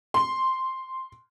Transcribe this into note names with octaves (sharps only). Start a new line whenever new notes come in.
C6